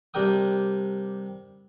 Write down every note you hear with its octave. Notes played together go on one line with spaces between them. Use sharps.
C3 G3 D4 A#4 G5 D#6